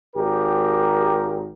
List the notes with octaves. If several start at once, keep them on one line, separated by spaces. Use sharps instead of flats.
G#1 G4 A#4